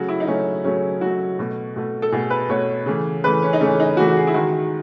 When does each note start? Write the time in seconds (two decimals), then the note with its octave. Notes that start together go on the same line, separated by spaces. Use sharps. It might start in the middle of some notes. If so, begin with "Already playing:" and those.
Already playing: C#3 F#3 A3 F#4
0.08 E4
0.20 D#4
0.27 C#3 F#3 A3 C#4
0.64 C#3 F#3 A3 C#4
1.01 C#3 F#3 A3 F#4
1.39 B2 A3
1.76 B2 A3
2.02 A4
2.12 B2 A3 G#4
2.30 B4
2.49 B2 A3 C#5
2.86 C#3 E3 A3
3.24 C#3 E3 A3 B4
3.42 C#4
3.53 D#4
3.60 C#3 E3 A3 C#4
3.80 D#4
3.97 C#3 E3 A3 F#4
4.08 F#4
4.17 G#4
4.27 E4
4.34 D#3 G#3 F#4